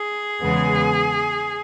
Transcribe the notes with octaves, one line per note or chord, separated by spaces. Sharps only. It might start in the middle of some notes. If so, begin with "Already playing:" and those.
Already playing: G#4
E2 C#3 G#3 B3